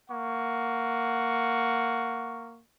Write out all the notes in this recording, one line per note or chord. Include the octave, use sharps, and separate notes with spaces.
A#3 F#5 C#6